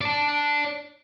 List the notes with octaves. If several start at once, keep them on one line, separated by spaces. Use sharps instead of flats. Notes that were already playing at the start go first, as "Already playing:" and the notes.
D5 A5